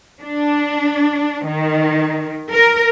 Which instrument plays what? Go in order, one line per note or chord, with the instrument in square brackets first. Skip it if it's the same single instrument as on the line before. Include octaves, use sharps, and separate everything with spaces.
[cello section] D4
D#3
A#4